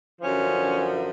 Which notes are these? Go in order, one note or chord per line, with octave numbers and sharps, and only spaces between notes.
F#2 D3 F3 C#4